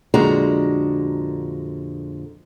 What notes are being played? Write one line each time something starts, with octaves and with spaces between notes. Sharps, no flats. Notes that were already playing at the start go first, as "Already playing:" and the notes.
F2 A#2 D3 G#3 F#4 A#5